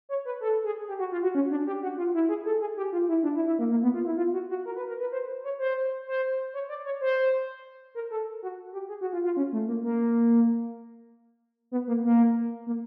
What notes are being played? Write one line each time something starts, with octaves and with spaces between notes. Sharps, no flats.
C#5
B4
A4
G#4
G4
F#4
F4
F#4
C#4
D4
G4
F#4
F4
E4
G#4
A4
G#4
G4
F4
E4
D4
E4
E4
A#3
A#3
B3
F4
E4
F4
F#4
F#4
A#4
B4
A#4
B4
C5
C#5
C5
C5
C#5
D5
C#5
C5
A#4
A4
F#4
G4
G#4
F#4
F4
F4
C#4
A3
A#3
A#3
B3
A#3
A#3
A#3